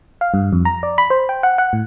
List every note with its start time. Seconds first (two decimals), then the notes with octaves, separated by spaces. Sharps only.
0.21 F5
0.34 G2
0.53 F2
0.65 A#5
0.83 D5
0.98 B5
1.10 C5
1.29 G5
1.43 F#5
1.58 F#5
1.73 A2